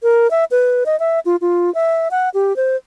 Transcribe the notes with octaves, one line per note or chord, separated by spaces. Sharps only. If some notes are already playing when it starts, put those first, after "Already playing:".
A#4
E5
B4
D#5
E5
F4
F4
E5
F#5
G4
C5